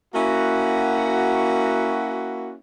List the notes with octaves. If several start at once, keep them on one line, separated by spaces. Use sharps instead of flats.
A#3 C#4 E4 F#4